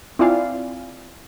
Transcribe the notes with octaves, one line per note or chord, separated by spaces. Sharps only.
C4 E4 F4 D5 F5 G#5